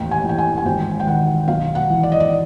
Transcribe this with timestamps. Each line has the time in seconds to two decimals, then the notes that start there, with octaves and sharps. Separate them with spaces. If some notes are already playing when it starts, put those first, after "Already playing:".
Already playing: A1 D#2 G5
0.11 G#5
0.24 E3
0.29 G5
0.38 G#5
0.58 G#5
0.65 G#1 G5
1.00 G5
1.07 D#3 F#5
1.48 B1 F5
1.75 F#5
1.90 E3
2.03 D5
2.12 D#5
2.20 D5